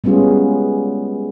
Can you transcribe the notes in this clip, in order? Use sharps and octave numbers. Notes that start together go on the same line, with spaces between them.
G3 G#3 B3 C#4 F4 G#4